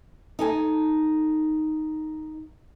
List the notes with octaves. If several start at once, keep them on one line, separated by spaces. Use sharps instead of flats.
D#4 A4 G#5